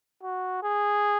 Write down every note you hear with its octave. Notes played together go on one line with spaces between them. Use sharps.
F#4
G#4